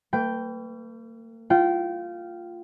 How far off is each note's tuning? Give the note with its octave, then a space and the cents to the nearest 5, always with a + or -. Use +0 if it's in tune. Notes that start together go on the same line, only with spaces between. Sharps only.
A#3 -45 B4 +15 G5 +0
F4 -5 G5 -25